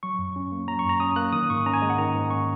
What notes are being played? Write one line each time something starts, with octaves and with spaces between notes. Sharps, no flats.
F#3 C#6
F#2
C#4
A#3
F#3 A#5
C#6
F#2 A#5
C#4 D#6
A#3 F#6
D#3 D#6
G#2 C#6
C#4 A#5
G#5
G#3 D#5
F#5
D#3 A#5
G#2
C#4 C#6